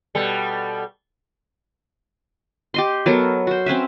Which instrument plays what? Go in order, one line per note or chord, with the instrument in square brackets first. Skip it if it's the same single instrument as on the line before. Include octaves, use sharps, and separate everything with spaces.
[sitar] B2 G3 A4
[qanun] G4 D#5 C6
F#3 B3 A4 A#4
F#4 C5
C4 C#4 B4 E5